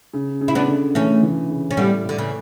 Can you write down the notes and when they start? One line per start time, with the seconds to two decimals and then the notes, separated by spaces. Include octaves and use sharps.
0.14 C#3
0.41 C#3
0.48 E4
0.55 B3 D4
0.68 D3
0.95 E3 A3 C#4
1.23 E3
1.50 C#3
1.71 C#4
1.77 A2 G3 B3
2.04 A2
2.09 D3
2.18 C#3 E3